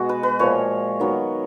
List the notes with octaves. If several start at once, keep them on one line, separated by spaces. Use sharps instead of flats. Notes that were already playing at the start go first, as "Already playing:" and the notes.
Already playing: B2 G#3 B3 F#4
B4
B4
A#2 F3 G#3 C#5
D#3 F#3 B3